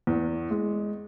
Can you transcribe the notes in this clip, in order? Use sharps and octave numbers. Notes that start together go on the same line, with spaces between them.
E2
G#3